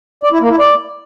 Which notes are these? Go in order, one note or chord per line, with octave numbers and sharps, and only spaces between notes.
D5
E4
A#3
E4
D5